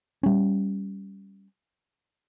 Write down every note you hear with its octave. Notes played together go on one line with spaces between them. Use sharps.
G3 C#4